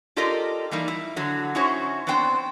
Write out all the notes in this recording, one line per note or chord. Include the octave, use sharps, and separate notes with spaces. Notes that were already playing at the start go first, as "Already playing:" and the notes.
F4 G4 A4 A#4 D5 D#5
E3 G3 A#3 D#4 D5
E4
D3 F#3
C#4 D#4 E4 F#4 C5 C#5
B3 C4 D4 C5 G5